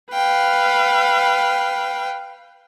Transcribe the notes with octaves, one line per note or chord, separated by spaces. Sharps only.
B4 F5 G5